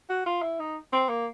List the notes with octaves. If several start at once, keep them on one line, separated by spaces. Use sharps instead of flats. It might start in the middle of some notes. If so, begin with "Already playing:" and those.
F#4
F4
E4
D#4
C4
A#3